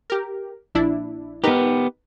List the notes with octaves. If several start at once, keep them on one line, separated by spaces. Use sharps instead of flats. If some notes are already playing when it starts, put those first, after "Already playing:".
G4 A#4
A#1 D4 E4
B3 D#4 G4 A#4 B4